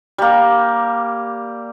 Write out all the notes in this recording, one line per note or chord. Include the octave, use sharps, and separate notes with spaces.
G3 A#3